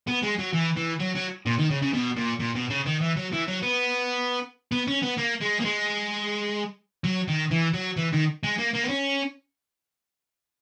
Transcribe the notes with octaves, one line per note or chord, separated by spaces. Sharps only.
B3
G#3
F#3
E3
E3
F#3
F#3
A#2
D#3
C#3
C#3
B2
A#2
A#2
B2
C#3
D#3
E3
F#3
E3
F#3
B3
B3
C#4
B3
A#3
G#3
A#3
G#3
F#3
D#3
E3
F#3
E3
D#3
G#3
A#3
A#3
B3
C#4